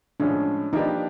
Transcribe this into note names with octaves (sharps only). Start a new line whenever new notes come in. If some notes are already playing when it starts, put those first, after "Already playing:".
A2 F3 G#3 C#4 D4
F3 A#3 D4 D#4 G4 B4